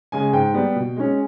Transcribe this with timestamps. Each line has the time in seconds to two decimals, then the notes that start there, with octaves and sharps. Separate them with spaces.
0.12 C#3 G#3 G#5
0.33 G#2 G5
0.54 G3 B3
0.76 B2
0.96 G#3 C#4